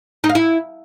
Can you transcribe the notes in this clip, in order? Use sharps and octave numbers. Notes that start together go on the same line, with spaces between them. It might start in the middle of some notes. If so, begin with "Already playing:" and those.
D#4
F5
E4